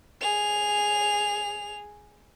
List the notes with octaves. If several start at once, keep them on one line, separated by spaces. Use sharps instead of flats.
G#4 F7